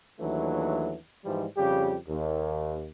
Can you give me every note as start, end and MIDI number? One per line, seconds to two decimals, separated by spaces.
0.20 0.95 39
0.20 0.95 52
0.20 0.95 54
0.20 0.95 57
0.20 0.95 62
1.25 1.46 44
1.25 1.46 52
1.25 1.46 53
1.25 1.46 55
1.57 1.95 41
1.57 1.95 49
1.57 1.95 55
1.57 1.95 67
2.08 2.86 39